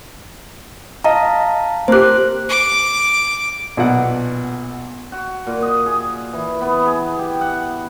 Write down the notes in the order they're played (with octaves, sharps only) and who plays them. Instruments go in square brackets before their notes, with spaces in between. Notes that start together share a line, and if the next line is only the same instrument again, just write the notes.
[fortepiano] D#5 [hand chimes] F5 A5 A#5
[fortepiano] A#3 G4 [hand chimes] C5 F#6
[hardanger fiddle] D6
[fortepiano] B1 A#2 F#5
[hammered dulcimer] F#4
A#2
D#5
G#4
E3
B3
G#4
G4
F#5